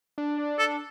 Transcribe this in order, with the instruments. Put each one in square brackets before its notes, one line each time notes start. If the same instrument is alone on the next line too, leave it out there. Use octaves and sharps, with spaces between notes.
[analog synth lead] D4
[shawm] A4